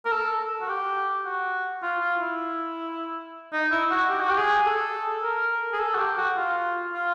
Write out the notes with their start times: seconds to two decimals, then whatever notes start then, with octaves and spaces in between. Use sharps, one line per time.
0.05 A#4
0.12 A4
0.61 F#4
0.69 G4
1.25 F#4
1.83 F4
2.01 F4
2.20 E4
3.53 D#4
3.71 E4
3.91 F#4
4.09 G4
4.20 F#4
4.29 G4
4.38 G#4
4.66 A4
5.23 A#4
5.72 G#4
5.80 A4
5.94 F#4
5.98 G4
6.18 F#4
6.37 F4
6.93 F4